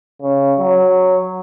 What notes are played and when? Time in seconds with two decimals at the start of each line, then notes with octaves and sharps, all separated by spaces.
0.22 C#3
0.59 F#3